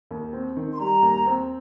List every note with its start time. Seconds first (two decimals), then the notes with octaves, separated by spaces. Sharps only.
0.11 D#2
0.33 C4
0.57 D#3
0.72 C6
0.80 G3 A#5
1.02 D#2
1.26 C4